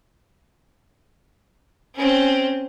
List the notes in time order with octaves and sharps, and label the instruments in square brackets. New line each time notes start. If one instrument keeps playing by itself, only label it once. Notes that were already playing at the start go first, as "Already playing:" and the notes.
[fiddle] C4 C#4